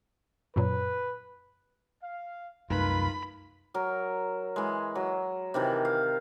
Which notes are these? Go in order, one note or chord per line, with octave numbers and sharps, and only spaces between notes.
F#2 A#2 F#3 B4
F5
C2 F#2 A3 D#4 F4 A#4 B4 B5
F#3 A#4
E3 G#3
F#3
C3 D#3 E3
F5